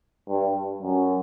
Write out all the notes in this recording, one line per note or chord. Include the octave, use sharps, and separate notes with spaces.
G2
F#2